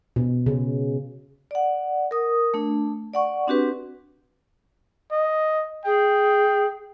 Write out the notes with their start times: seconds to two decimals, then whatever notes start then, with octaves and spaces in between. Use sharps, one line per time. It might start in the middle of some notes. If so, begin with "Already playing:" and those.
0.16 B2
0.46 C#3
1.51 D5 F#5
2.11 A#4 D#6
2.54 A3 D4
3.13 D5 F#5 C#6
3.47 C4 D4 F#4 G4 B4
5.12 D#5
5.85 G#4 G5